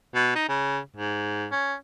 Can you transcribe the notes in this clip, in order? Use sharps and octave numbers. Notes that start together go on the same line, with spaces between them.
B2
D#4
C#3
G#2
C#4